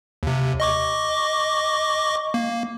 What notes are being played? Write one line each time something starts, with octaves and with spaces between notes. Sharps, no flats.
D#2 C3
D#5 C#6 D6
A#3